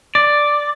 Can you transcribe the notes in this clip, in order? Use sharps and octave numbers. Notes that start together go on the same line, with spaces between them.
D5